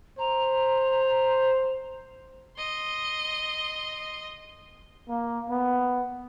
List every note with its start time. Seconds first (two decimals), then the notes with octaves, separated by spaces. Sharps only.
0.19 C5 A#5
2.57 D#5 C6
5.09 A#3
5.50 B3